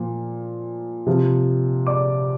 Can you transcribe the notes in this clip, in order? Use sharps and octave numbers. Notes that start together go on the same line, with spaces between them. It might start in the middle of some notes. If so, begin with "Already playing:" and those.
Already playing: A#2 F3
C3 F3
D5 D6